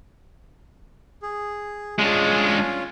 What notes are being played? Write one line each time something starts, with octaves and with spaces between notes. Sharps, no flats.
G#4
G#3 C#4 D4 F4